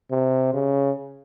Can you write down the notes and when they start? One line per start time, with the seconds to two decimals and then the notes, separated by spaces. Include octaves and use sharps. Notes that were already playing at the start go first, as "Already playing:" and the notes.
0.10 C3
0.53 C#3